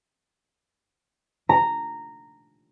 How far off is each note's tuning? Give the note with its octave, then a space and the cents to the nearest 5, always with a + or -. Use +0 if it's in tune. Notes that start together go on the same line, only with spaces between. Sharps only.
A#5 -10